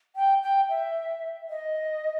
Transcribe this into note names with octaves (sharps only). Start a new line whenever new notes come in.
G5
G5
E5
D#5